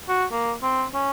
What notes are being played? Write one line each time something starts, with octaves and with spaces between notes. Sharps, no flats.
F#4
A#3
C4
C#4